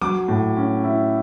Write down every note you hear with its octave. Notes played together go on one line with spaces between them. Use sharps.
F#3 D6
A2
C#4
E4